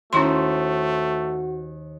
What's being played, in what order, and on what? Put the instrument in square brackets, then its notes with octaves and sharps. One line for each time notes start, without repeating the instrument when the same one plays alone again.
[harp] D#2 C5 [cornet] A3 [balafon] C#4 E4 C6 [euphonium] F#4